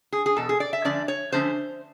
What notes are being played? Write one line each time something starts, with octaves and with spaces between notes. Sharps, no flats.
G#4
G#4
E2 B2 A4
G#4
D5
E5
D3 F3 A3 C#4 D5
C#5
D3 F3 A3 C#4 C5